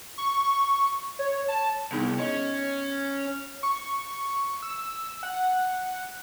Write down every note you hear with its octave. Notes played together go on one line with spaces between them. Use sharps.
C#6
C#5
A5
C2 B3 D#4 G#4
C#4 D#5
C#6
E6
F#5